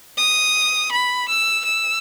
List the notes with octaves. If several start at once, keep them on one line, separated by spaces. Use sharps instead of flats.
D#6
B5
E6
E6